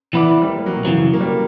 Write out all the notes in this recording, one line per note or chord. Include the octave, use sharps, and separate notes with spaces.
E3 B3 E4 B4 D5
G3
A#3
G3
F#3
B2
F#2 C#3 E3 F#3
A#3
G3